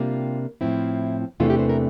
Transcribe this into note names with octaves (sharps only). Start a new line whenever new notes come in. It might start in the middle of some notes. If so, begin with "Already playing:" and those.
Already playing: C3 G3 A#3 D4 F4
A2 F3 C4 E4
E2 C3 E3 A3 D4 F4
G4
C5
A#4